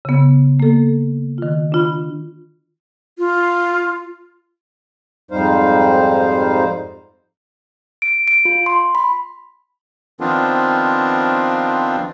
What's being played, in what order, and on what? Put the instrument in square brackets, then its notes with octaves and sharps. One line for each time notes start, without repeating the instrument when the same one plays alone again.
[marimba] C#3 B3
A#3 A4
D#3 F4
D4 F4 B5
[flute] F4
[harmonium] F2 G#2 G3 D#4 C5 F5
[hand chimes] D7
D7
F4
C6
B5
[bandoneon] D#3 F3 B3 C4 D4 F4